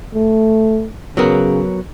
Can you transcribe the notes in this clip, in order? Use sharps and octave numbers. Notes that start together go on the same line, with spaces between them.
A3
C#3 F#3 B3 A#4